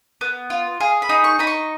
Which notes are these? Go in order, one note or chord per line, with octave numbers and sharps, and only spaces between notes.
B3
F4
G#4 F5
B5
D#4
C#6
D#4 B5
C#6